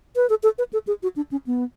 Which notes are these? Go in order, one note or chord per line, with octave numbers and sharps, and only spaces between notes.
B4
A4
A4
B4
A4
G#4
F#4
D4
C#4
B3